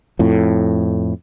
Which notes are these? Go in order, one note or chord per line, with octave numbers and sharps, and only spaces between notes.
F2 A2